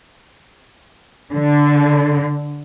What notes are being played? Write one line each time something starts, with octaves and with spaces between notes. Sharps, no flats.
D3